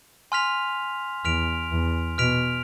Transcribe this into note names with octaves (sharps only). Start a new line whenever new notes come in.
G#5 C6 F6 B6 F7
E2 F6 B6 D7 F7
E2
B2 F6 B6 D7 F7